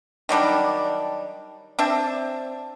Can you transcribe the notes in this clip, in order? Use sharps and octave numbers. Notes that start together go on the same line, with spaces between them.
D#3 F#3 G3 D4
C4 D4 E5